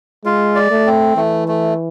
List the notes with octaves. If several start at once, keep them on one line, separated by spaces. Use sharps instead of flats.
G#3 F4
D5
A3
C4
E3 A3
A3